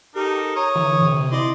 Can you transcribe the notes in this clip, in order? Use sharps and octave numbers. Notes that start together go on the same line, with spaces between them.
D#4 G4 A4 A#4
C#5 A#5 D#6
D3 E3
C3
E4 D5 D#5 C6